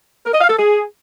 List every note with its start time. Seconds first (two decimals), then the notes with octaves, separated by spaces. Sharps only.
0.25 A#4
0.33 D#5
0.41 F5
0.49 A4
0.57 G#4